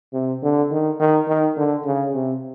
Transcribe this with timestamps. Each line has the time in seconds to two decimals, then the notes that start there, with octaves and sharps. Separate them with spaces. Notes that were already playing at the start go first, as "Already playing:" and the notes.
0.13 C3
0.43 D3
0.71 D#3
1.00 D#3
1.28 D#3
1.57 D3
1.85 C#3
2.14 C3